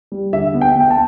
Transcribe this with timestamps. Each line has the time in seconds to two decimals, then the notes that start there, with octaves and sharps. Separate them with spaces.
0.12 G3
0.33 D3 E5
0.54 B3
0.61 G5
0.76 B3 G5
0.90 A5